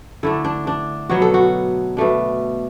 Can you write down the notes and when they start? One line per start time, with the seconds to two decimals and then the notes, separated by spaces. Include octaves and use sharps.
0.23 D3 A3 D4 E4
0.45 D4
0.67 D4
1.09 B2 F#3 B3 F#4
1.22 A4
1.34 F#4
1.97 B2 A3 D4